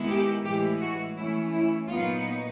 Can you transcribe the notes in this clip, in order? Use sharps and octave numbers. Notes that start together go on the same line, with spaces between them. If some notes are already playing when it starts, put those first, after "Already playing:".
Already playing: D#3 G#3 B3 E4
G4
A2 E3 G#3 G4
F#4
E3 A3 C#4 E4
E4
A#2 F#3 B3 D#4 F4